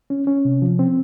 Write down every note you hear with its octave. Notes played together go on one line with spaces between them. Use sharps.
C#4
C#4
C3
F3
C4